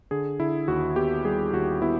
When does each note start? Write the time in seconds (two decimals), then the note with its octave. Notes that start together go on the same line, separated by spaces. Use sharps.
0.11 D3 G#4
0.40 D3 E4
0.68 D#2 F#4
0.96 B3 G4
1.25 G3 G#4
1.53 D#2 F#4
1.82 B3 E4